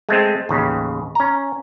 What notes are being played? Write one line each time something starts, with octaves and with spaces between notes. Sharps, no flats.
G#3 A3 C4
A1 D#2 C#3
C#4 A#5